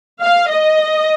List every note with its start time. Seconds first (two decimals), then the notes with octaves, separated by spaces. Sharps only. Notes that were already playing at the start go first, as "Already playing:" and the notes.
0.22 F5
0.51 D#5